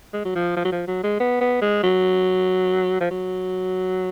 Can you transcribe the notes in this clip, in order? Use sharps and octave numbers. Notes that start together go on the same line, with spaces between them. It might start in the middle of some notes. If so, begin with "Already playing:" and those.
G#3
F#3
F3
F3
F#3
F3
F#3
G#3
B3
B3
G#3
F#3
F3
F#3